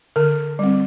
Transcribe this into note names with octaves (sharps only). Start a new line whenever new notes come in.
D3 A#4
G3 C4